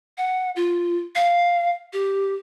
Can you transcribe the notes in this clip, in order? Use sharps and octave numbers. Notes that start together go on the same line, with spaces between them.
F#5
F4
F5
G4